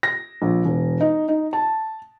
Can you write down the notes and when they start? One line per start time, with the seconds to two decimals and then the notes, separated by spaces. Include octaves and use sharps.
0.03 A#6
0.42 A#1
0.65 E1
1.01 D#4
1.28 D#4
1.53 A5